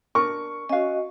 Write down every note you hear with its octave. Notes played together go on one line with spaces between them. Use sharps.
D4 A#4 C#6
C#4 F#4 D#5 F5